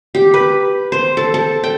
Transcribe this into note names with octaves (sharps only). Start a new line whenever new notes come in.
G4
B4
C5
A4
A4
G5